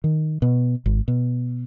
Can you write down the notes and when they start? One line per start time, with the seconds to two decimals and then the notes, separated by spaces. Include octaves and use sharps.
0.04 D#3
0.42 B2
0.86 G#1
1.08 B2